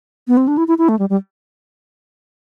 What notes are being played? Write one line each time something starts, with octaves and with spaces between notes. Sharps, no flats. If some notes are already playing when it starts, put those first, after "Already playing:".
B3
C4
D4
E4
E4
E4
A3
G3
G3